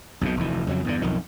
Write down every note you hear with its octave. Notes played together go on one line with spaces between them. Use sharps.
B1 F2 G#2 B2
F1 D2 E3
F2 C#3 E3 F#3
E2 G2 D3
B1 F2 D#3